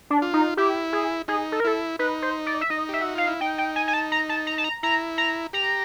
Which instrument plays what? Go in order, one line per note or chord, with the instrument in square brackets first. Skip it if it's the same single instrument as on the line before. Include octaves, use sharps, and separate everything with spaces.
[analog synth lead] D4
[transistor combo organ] F4
[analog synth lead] D#4
[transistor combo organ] E4 [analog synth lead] G4
[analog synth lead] G#4
[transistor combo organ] D#4 [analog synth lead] G#4
[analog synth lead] A4
A#4
[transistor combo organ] E4 [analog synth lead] A4
[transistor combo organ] D#4 [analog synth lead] B4
[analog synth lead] C5
D5
E5
[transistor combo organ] D#4 [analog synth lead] D#5
[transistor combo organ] G4 [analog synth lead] E5
[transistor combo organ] F#4
[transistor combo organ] F4 [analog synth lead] F5
[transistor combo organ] E4
[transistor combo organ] D#4 [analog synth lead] G5
[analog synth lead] G5
G#5
G#5
A5
A#5
A5
A#5
A5
A#5
[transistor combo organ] E4 [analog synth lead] A#5
[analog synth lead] A#5
[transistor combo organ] G4 [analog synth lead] A#5